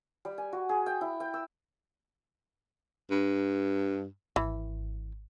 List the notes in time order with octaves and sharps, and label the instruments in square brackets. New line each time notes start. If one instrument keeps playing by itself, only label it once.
[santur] G3
G#5
F#4
G#4
G5
E4
G5
E6
[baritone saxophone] G2
[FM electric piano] G#1 [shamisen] E3